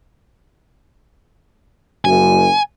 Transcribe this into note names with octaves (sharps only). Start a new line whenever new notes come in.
F#1 F#2 G#5